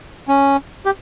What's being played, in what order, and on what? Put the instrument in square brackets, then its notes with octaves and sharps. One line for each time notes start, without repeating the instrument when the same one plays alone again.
[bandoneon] C#4
G4